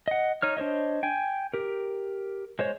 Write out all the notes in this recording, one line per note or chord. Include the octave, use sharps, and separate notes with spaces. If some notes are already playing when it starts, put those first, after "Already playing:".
D#5 F#5
D#4 C#5 F6
D4 C5 C#5 D#5
G5 G#5
G4 A#4
G#3 C5 C#5